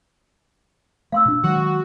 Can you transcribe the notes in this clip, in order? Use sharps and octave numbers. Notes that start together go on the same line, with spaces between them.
A3 F5 C6 E6
A#2 D4
D#3 F#3 G#3 F#4